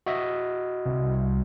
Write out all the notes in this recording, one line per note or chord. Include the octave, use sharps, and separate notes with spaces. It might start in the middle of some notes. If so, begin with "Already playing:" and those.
F#4 D#5 E5
C2